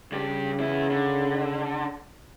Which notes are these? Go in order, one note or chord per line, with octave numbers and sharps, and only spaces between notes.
G2 C#3 G4
E2 E4
D3